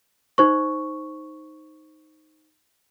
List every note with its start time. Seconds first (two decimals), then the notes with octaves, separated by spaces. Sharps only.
0.38 D#4 C5 C#6